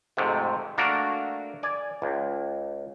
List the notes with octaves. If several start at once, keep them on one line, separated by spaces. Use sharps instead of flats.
F2 G#2 C3 A3
A3 A#3 D4 F#4 A#4
D5 G#5
C#2